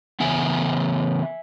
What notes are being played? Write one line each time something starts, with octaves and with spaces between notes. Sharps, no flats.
C#3 E3 B3 E5 G#5